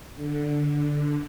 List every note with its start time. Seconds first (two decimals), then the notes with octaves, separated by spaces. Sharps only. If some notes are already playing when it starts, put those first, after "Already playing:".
0.15 D3